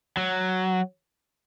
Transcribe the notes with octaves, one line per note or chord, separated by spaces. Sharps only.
F#3